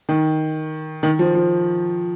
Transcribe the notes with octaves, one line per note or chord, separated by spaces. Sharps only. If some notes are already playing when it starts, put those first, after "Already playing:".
D#3
D#3
F3
F3